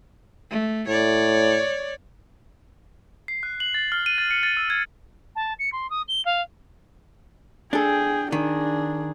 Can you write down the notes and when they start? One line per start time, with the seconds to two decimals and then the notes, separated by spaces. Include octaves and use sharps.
0.50 A3
0.88 A2 C#5 D5
3.28 C7
3.43 F#6
3.60 F#7
3.74 A6
3.92 F6
4.06 D#7
4.18 A6
4.31 C#7
4.43 A6
4.57 E6
4.70 G#6
5.35 A5
5.59 C#7
5.72 C6
5.90 D#6
6.08 G7
6.25 F5
7.73 D4 G#4 A4 G5
8.32 D#3 D4 G#4